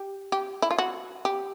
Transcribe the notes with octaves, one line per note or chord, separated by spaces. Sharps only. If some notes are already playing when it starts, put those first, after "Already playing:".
Already playing: G4
G4
E4
F4
F#4
G4